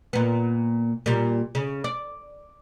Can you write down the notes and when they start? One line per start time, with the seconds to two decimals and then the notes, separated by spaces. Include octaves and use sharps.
0.13 A#2 B3
1.06 A#2 G3
1.55 C#3
1.84 D5